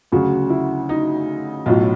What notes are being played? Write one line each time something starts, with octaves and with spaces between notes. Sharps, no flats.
D2 C#3 F#3 F#4
E4
D#4
B1 A2 F#3 F4